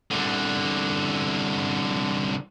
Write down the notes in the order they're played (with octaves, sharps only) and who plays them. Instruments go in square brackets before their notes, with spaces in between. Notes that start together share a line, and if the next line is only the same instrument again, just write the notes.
[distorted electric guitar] C2 D3